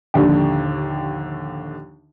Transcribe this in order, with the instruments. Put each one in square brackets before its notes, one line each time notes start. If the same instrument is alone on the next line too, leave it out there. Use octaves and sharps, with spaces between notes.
[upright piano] A#1 D#2 D3 D4 G4